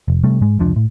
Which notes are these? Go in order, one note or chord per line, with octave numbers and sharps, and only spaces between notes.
F1
C3 G3 A3
G#2 G#3
F1 C#2 F3 D4
A2